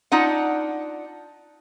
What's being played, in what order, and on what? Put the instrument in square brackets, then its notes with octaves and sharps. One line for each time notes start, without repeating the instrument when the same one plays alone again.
[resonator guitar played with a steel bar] D4 D#4 F4 F#5